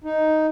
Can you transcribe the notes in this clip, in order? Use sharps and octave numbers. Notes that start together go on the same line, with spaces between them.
D#4